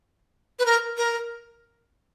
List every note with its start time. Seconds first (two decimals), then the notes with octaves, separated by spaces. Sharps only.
0.59 B4
0.66 A#4
0.97 A#4